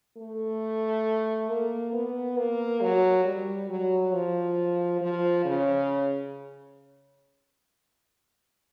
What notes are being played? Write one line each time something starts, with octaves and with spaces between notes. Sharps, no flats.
A3
A#3
B3
A#3
F#3
G3
F#3
F3
F3
C#3